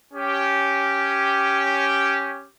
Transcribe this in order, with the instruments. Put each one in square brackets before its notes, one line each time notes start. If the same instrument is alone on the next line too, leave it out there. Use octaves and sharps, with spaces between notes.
[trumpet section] C#4 G4